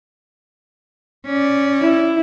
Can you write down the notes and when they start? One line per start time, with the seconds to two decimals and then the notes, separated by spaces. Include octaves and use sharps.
1.26 C#4 D5
1.82 E4